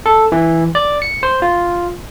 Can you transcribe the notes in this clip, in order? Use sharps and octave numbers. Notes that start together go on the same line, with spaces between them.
A4
E3
D5
C#7
C5
F4